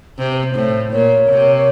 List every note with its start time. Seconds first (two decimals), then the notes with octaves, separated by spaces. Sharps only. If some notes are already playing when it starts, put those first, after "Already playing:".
0.18 C3 C5
0.36 C5
0.55 A2
0.91 A#2 A#4 C#5
1.29 C3